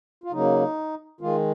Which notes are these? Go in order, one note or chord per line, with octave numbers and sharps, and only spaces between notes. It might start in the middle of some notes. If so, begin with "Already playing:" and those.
F4
C#3 F#3 A#3 D#4
D#3 G#3 F4